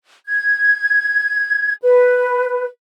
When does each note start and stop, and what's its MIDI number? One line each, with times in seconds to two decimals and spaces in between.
0.28 1.73 92
1.82 2.66 71